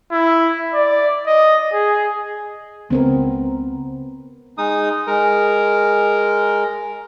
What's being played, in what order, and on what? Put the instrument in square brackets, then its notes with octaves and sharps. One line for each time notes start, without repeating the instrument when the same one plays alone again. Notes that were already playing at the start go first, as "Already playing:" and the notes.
[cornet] E4
D5
D#5
G#4
[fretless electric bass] C#2 [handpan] B3 C4 A#4
[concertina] G#3 D#4 D#6
G#3 A#4